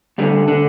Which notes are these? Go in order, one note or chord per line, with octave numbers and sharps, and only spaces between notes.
D2 D3 G3
D3